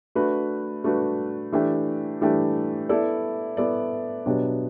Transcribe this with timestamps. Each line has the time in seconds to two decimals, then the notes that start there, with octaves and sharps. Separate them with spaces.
0.15 A3 D4 F#4 B4
0.84 A3 D4 F#4 B4
1.52 E3 A3 D4 G4
2.21 E3 A3 D4 G4
2.89 B3 E4 A4 D5
3.57 B3 E4 A4 D5
4.26 B2 F#3 B3 D4 G4